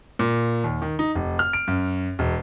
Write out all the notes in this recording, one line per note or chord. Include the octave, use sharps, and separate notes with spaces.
A#2
D#2
D#3
D#4
F1
F6
D7
F#2
E1